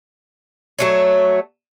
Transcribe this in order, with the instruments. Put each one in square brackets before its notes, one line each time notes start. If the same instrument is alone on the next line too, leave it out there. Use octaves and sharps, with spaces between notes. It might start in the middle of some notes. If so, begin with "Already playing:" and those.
[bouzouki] F#3 A3 C#5